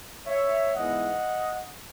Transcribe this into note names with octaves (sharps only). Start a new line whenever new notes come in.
C#5 E5
G#2 E3 G#3 B3 D#5 F#5